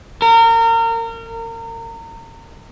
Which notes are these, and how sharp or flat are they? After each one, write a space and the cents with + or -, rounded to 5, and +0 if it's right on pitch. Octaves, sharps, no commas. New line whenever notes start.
A#4 -30